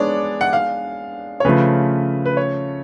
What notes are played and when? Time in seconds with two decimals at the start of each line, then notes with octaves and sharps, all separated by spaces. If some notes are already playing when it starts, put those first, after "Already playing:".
Already playing: G#3 B3 D4 G#4 C#5 D5
0.41 F#5
0.53 F5
1.40 C#5
1.45 C#3 F3 A3 F4 B4
2.26 B4
2.37 C#5